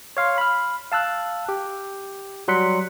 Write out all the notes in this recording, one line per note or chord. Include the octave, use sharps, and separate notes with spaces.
C#5 F5 C6
B5 F6
F5 A5 E6 F#6
G4
F#3 G3 C6 F#6 B6 C#7